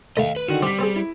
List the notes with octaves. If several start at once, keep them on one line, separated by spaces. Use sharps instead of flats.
D#2 A3 D#5 F5 A#5
B4
D3 D#3 F#4 D#7
G3 C4 D6 B6
B3 C4 G#4
E4